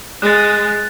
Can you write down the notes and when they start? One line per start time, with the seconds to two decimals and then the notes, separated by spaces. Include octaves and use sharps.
0.22 G#3 F#6 A6